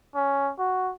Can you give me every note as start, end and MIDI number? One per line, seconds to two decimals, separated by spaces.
0.15 0.51 61
0.59 0.92 66